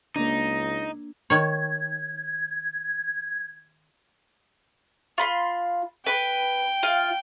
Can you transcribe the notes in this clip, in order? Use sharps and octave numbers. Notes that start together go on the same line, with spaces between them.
C#2 A#3 D4 D#4 A#6
D#3 C#5 G#6
F4 B5 C6
B4 G5
F4 F5